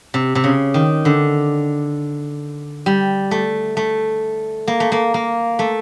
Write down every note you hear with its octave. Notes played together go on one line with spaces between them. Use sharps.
C3
C3
C#3
D#3
D3
G3
A3
A3
A#3
A3
A#3
A#3
A3